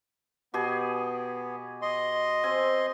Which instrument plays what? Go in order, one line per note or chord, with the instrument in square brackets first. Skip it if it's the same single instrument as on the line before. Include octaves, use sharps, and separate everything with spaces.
[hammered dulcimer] B2 G4 G#4 [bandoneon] B3
[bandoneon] D#5 C6
[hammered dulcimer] C4 G#5